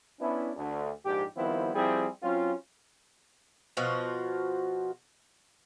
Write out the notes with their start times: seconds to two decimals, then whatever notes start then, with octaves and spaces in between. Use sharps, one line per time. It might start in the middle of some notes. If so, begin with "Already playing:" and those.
0.20 B3 C#4 D4 E4
0.56 D2
1.05 A#1 G#2 D4 G4
1.36 D#3 F3 G3 B3 C4 E4
1.74 F3 G3 C4 E4 G#4
2.22 F#3 C4 C#4 F4
3.77 B2 F3 F4 F#4